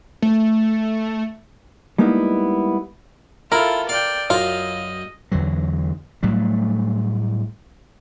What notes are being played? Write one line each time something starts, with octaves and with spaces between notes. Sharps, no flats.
A3
G3 G#3 A#3 B3 D#4 E4
E4 F4 A4 A#4
D5 F5 G5
F#2 F4 D#5 F5
E2 D3 E3 F#3
A2 F#3 G3 A3